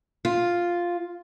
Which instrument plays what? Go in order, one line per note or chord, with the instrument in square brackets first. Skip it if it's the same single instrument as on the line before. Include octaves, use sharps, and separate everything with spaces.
[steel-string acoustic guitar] F4